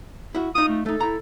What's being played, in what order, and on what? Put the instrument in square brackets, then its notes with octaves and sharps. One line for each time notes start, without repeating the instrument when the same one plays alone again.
[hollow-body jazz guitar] E4 F#4
[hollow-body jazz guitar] D#4 F4 [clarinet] D#6
[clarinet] A3
[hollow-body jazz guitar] A3 D#4 [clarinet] A4
[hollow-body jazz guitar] E4 A#5